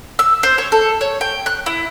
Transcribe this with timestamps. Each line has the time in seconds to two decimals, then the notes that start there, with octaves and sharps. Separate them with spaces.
0.19 E6
0.43 C5
0.58 C#5
0.72 A4
1.01 C#5
1.21 G5
1.46 F#6
1.66 E4